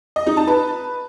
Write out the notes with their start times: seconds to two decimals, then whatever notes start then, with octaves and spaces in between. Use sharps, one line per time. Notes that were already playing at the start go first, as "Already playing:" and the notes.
0.16 D#5
0.26 D#4
0.37 A5
0.47 B4